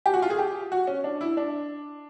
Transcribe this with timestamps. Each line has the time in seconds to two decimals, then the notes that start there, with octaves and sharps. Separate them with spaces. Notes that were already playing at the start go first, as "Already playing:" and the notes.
0.06 G4
0.14 F#4
0.22 F4
0.30 G#4
0.39 G4
0.72 F#4
0.87 C#4
1.04 D4
1.21 E4
1.37 D4